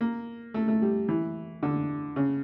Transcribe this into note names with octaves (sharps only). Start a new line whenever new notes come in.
A#3
A3
A3
G3
E3
D3
C#3